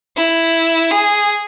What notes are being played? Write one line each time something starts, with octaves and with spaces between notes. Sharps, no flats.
E4
G#4